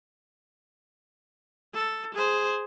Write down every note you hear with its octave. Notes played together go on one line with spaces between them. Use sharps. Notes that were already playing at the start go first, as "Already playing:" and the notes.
A4
G#4 C5